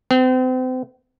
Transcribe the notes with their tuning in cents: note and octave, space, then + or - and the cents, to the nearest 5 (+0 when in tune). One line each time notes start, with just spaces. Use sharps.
C4 -35